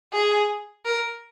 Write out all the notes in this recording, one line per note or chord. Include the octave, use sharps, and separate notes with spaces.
G#4
A#4